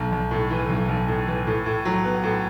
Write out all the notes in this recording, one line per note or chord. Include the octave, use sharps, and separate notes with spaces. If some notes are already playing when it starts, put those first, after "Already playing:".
Already playing: B1
B1
A2
E3
B1
B1
A2
E3
A2
A2
F#3
B3
A2